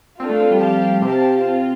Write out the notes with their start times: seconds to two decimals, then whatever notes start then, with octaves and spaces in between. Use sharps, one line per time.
0.20 C4 D4 F4 A4
0.30 A3
0.40 C4
0.51 G3
0.60 F3 G4 F5 A5
1.02 C3 C4 G4 C5 F5 A5
1.42 C4 F4